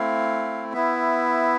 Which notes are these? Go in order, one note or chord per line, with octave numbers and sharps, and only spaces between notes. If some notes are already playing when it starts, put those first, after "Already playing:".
Already playing: A3 C4 E4 F5
B3 E4 E5